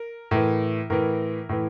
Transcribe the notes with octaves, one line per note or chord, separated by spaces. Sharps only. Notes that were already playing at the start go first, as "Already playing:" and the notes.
Already playing: A#4
A2 E3 A#4
A2 E3 A#4
A2 E3